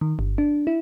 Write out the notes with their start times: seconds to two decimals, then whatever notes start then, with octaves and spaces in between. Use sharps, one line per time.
0.01 D#3
0.19 G1
0.38 D4
0.67 E4